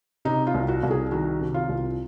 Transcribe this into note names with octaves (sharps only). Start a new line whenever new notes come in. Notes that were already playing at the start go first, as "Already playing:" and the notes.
C3 D#4
F4
C2
F#4
C2
G#4
D#3 F#4
C3
F4
C2